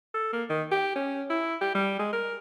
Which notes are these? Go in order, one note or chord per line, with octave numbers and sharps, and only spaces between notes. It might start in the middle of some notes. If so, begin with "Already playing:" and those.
A4
A#3
D#3
G4
C#4
E4
G4
G3
G#3
A#4